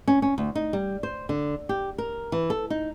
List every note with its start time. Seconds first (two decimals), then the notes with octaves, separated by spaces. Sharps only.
0.08 C#4
0.22 C#4
0.38 D2
0.55 D#4
0.73 G3
1.03 C5
1.29 D3
1.69 G4
1.98 A#4
2.32 E3
2.50 A4
2.70 D#4